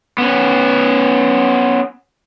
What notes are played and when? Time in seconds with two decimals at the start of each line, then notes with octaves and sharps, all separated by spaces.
0.18 B3 C#4